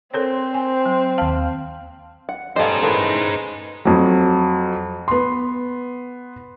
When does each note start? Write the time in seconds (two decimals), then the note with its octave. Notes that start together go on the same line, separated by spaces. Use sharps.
0.14 C4 A4 A#4 C5 C#5
0.54 G#5
0.86 F#3
1.18 D#2 F5 A5
2.29 F#5
2.56 G3 B3 C#4 D#4 A4 C5 D#5 F5
2.82 D#3 E3 A3 G#4 B4
3.85 F2 F#3
5.08 B3 C6